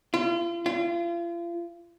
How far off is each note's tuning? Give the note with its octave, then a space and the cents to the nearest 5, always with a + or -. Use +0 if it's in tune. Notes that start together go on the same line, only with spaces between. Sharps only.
F4 -40
F4 -35